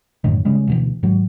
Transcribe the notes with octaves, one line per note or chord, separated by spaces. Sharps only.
F#2 A2 D3 D#3
C#3 G3 G#3 C#4
D2 B2 E3
G#2 D#3 F#3